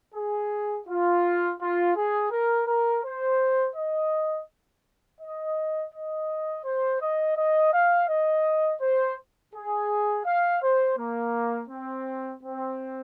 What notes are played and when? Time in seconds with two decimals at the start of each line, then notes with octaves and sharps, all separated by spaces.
0.14 G#4
0.87 F4
1.59 F4
1.95 G#4
2.31 A#4
2.67 A#4
3.04 C5
3.75 D#5
5.20 D#5
5.93 D#5
6.64 C5
7.01 D#5
7.36 D#5
7.73 F5
8.09 D#5
8.81 C5
9.54 G#4
10.26 F5
10.62 C5
10.97 A#3
11.69 C4
12.42 C4